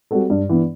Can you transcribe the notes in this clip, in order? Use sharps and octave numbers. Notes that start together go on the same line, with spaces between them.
G3 C4 F#4 A4
G2
E3 B3 D4